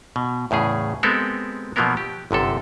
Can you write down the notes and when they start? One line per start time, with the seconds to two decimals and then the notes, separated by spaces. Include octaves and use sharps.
0.16 B2
0.51 E2 A2 C#3 G#4
1.03 G#3 B3 C4 G4 A4 A#4
1.76 B2 F3 F#3 A#3 B3 A#4
1.97 G4
2.31 G1 F#2 C3 A4